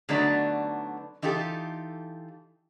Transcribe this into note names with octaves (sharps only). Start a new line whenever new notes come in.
D3 F#3 A3 B3 D4 D#4
E3 D#4 F4 G4 A4